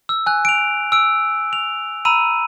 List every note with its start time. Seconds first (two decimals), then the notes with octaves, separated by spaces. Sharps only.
0.09 E6
0.26 G#5 F#6
0.45 D7 F7
0.92 E6 D7
1.53 F7
2.05 A#5 B5 E6 D#7